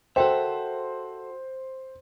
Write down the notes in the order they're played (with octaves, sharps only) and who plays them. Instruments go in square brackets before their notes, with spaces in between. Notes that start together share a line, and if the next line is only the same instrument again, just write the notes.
[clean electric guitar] F#4 A4 E5 [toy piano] A#4 G5 [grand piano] C5